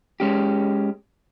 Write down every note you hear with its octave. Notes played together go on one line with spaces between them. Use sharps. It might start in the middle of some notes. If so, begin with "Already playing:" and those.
G#3 C#4 G4